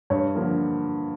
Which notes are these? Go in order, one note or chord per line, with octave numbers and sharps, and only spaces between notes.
G2 C#5
D3 F3 A#3